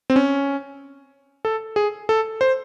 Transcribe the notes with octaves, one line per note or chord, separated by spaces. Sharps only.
C4
C#4
A4
G#4
A4
C5